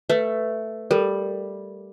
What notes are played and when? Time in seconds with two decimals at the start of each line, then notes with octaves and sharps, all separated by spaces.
0.10 A3 B4
0.91 G3 A4 A#4